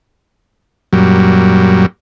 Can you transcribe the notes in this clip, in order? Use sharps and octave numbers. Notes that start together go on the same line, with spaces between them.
F#2 A#2 F#3 G3